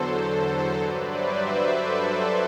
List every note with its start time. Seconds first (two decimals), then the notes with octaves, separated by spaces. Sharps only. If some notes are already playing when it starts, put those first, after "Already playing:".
Already playing: E2 D3 F#3 A4 C5
0.80 G2 F#3 B4 D5
1.10 C5 E5
1.40 B4 D5
1.70 A4 C5